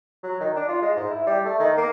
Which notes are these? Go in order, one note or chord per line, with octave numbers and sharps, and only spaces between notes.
F#3
D#3
D4
F4
G#3
G#2
E4
G3
A3
D#3
A#3